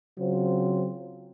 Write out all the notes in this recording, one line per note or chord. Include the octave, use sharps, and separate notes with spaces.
C#3 F#3 C4 F4 C5